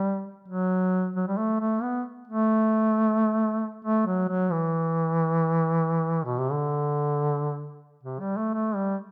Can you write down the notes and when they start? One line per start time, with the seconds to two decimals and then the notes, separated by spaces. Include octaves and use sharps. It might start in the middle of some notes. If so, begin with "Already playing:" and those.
Already playing: G3
0.48 F#3
1.16 F#3
1.27 G3
1.37 A3
1.60 A3
1.82 B3
2.27 A3
3.84 A3
4.07 F#3
4.29 F#3
4.51 E3
6.24 B2
6.38 C3
6.52 D3
8.03 C3
8.20 G3
8.37 A3
8.54 A3
8.75 G3